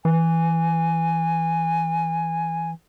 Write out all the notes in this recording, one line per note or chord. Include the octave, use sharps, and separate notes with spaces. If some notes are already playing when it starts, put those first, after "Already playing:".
E3 G#5